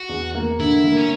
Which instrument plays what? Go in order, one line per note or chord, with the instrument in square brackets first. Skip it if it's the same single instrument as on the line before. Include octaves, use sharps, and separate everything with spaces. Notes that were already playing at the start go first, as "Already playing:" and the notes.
Already playing: [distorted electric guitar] F#4
[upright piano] E2
A#3
[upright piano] D3 [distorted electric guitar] E4
[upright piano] A#3
[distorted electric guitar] C#4